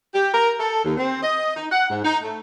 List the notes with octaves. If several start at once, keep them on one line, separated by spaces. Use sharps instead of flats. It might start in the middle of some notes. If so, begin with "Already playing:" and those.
G4
A#4
A4
D#2
C4
D#5
D#4
F#5
G#2
D#4
A3